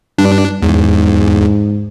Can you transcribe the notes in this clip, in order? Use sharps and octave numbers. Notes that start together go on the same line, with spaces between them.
G2 D4
E2 G#2